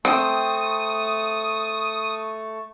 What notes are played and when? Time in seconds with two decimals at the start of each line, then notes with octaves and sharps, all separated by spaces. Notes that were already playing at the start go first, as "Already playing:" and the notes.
0.05 A3 C4 A5 C#6 D#6